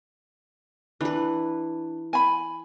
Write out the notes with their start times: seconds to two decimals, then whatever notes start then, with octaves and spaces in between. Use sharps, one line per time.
1.01 E3 D4 B4
2.13 G#5 B5